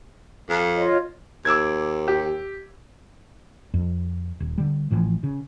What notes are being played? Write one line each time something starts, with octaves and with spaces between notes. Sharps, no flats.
F2
F4 C#5 D#5
D#2 D6 E6 G#6
G4
F2
D#1
D3 G3
A1 A2 E3 F3
C#3